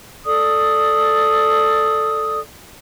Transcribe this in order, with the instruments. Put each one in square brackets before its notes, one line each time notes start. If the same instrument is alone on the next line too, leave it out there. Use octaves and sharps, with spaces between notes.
[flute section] A4 D5 D#6